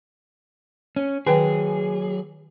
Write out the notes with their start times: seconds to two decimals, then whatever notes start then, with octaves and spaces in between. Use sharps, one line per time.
0.96 C#4
1.27 D#3 F#3 G#4 B4 G5